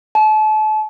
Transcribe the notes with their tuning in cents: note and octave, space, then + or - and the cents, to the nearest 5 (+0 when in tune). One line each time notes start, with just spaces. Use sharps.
A5 -35